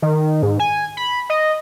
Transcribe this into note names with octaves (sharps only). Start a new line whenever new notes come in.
D#3
G#2
G#5
B5
D#5